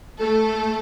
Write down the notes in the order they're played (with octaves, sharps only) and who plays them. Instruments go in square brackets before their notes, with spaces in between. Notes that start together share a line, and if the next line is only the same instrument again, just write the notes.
[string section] A3 A4